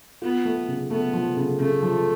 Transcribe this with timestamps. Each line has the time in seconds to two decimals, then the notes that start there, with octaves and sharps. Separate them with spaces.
0.22 B3 F4
0.45 A3
0.68 C#3
0.90 A3 B3
1.13 F3
1.36 C#3
1.60 C#3 A3
1.82 F3